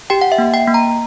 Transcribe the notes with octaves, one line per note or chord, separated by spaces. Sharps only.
G4 G5
F#5
E5
A#3
G5
A#3
A#5